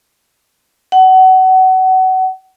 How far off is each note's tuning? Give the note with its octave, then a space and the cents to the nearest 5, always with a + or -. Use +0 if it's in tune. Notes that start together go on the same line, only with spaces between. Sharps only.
F#5 +25